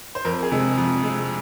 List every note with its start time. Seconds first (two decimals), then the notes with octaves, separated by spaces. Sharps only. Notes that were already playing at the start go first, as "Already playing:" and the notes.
0.15 C5
0.25 F2 A#4
0.43 G#4
0.51 C3 G#3
0.77 F2
1.03 C3 G#3